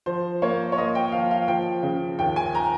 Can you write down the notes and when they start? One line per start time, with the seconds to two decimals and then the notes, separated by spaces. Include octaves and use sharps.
0.06 F3 C5
0.42 A#3 C#5
0.72 C#5
0.78 A#3 D#5
0.95 G5
1.12 F3 F5
1.31 F5
1.48 F3 G5
1.83 C#3
2.19 D#2 G5
2.36 G#5
2.55 A#5